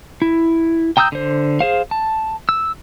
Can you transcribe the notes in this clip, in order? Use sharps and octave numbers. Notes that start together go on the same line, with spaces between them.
E4
G5 A#5 D#6 E6 G6
D3 C5
G#4 C5 F5
A5
E6